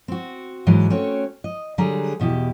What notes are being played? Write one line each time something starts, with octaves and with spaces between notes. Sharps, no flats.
C4 F#4
G#2 E3 F#3
A3 C4 C#4 F#4 C#5
D#5
D3 F#3 G3 G#4 A#5
E2 B2 E4 G4